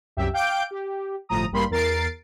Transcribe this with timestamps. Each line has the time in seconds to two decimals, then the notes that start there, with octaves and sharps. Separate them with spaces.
0.17 C2 F#2 G4 E5
0.33 F5 G5 D6 G6 D7
0.71 G4
1.29 G1 A2 F3 A#5 D#6
1.51 A1 G2 G3 A#3 B5 C6
1.70 E2 A#4 A6 C7 D7